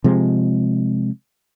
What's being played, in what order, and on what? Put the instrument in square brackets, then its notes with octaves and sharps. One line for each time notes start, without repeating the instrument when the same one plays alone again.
[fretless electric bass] C3 F3 G#3